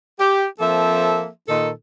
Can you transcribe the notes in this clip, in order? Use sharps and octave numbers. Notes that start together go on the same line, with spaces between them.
G4
F3 A#3 C4 A4 E5
A#2 D#3 D#4 A4